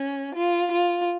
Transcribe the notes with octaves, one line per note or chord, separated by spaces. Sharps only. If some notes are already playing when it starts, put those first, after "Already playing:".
Already playing: C#4
F4
F4